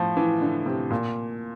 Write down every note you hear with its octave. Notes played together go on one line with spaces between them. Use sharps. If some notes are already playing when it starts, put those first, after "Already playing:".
Already playing: A2 F3
E3
D3
C3
A#2